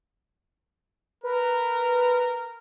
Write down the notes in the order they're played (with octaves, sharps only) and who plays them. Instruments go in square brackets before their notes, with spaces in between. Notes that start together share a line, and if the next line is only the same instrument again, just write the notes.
[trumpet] A#4 [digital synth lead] B4